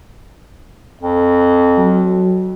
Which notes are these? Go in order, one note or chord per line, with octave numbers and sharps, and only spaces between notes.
F2
F#3